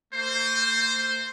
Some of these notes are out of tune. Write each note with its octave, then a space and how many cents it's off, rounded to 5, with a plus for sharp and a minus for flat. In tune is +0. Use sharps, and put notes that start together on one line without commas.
A#3 -45 C5 +0